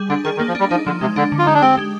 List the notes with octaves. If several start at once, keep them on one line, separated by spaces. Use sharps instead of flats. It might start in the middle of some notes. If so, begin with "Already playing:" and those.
Already playing: G3 G#4
D3 D4
D#3 G#4
D#3
A#3
F3
D4
G3
F3 D#4
D3 F3
C3 G#3
D3 D4
D3
F4
G#3 D#4
D4
C4 G4
G#3